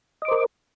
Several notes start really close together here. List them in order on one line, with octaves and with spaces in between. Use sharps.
D#5 D6 C5 A#4